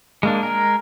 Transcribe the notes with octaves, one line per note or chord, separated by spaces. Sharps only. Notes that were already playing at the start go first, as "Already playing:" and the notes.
G#3 A#3 D4
G#3 A#4